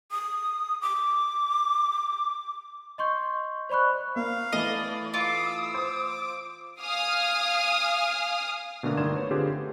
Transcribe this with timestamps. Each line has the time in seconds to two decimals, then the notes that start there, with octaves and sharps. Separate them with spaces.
0.11 D#6
0.82 D6
2.98 D#5 C6 C#6 G6
3.69 C5 D5 B5 C#6 F#6
4.16 A#3 F5
4.52 E3 A3 A4 D5 D#5
5.14 F4 D6 E6
5.74 C5 D6
6.81 F5 G#5 D#6 F6
8.83 B2 D3 A3 A#3 D4
8.97 G1 D#3 D5 C6 G#6 E7
9.14 B4 C#5
9.31 D3 C4 F4 G4 G#4 B4
9.52 A3